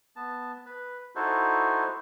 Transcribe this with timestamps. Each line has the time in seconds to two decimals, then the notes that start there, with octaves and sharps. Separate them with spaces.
0.16 B3 A5
0.66 B4
1.15 D#4 E4 F#4 A4 C5